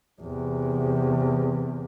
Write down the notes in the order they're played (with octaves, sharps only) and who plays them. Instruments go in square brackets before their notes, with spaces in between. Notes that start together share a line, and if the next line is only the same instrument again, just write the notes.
[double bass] E2 C3